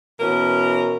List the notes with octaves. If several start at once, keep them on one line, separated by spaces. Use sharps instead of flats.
B2 E3 C#4 A#4